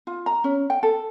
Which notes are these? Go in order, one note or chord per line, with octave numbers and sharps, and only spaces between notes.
F4
A#5
C#4
G5
A4